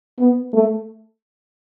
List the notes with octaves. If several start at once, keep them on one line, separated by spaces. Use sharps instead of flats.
B3
A3